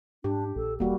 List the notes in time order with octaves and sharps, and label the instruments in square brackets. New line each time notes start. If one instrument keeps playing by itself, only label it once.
[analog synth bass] G#2 [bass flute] D4 [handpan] G4
[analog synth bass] A#1 [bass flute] A4
[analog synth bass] E1 [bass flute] G3 [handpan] A#3 F#4